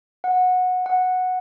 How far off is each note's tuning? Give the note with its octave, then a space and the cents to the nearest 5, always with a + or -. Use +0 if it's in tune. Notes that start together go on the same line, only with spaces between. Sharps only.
F#5 -15
F#5 -10